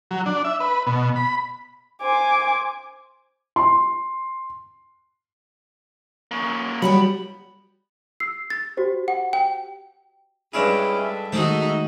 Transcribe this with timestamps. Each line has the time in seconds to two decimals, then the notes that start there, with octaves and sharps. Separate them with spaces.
0.11 F#3
0.26 D4
0.45 E5
0.60 B4
0.87 B2
1.16 B5
2.02 C5 G#5 D6
3.56 C6
6.31 A#3 C#4
6.82 F#3 G3 B3 F#4 G4 B5
8.20 E6 C7
8.50 A6
8.77 F#4 G4 C5
9.08 F#5
9.33 G5
10.53 G2 G#3 C#4 D4 E4 G#4
11.04 A4 E5
11.32 D#3 G#3 A3 D#4 F#4 G#4 C5